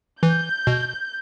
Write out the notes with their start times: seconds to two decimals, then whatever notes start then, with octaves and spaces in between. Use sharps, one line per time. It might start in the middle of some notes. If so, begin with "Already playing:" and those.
0.23 E3 G6
0.67 B2